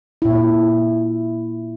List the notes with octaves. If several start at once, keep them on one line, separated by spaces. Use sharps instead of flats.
A#2 E4